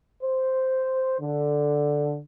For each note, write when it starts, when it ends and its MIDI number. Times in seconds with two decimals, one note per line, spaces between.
0.23 1.15 72
1.19 2.19 50